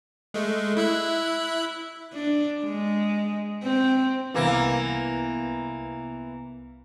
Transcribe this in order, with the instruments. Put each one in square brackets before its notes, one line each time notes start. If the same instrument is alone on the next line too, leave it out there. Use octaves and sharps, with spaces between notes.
[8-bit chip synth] G#3 A3
E4 E5 F#6
[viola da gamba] D4
G#3
C4
[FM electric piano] C2 B3 [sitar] E3 A#3